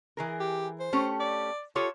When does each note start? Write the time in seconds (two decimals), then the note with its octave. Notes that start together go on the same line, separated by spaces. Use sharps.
0.17 E3 G#4 A#4
0.40 G4
0.80 C5
0.93 A3 C#4 G4
1.20 D5
1.76 F4 G4 A4 C#5